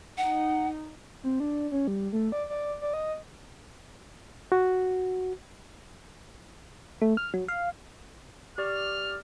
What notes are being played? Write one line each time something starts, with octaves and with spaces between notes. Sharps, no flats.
D#4 F#5
C4
D4
C#4
G3
A3
D5
D5
D5
D#5
F#4
A3
F6
F#3
F5
G4 D5 C#6 F6